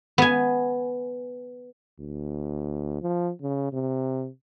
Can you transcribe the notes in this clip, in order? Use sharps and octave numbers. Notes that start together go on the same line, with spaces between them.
B3 G#5
D2
F3
C#3
C3